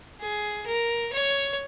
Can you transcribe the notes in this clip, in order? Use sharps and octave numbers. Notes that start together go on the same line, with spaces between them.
G#4
A#4
C#5